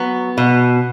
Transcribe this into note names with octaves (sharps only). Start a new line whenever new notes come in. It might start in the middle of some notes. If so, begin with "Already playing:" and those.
Already playing: F#3 B3
B2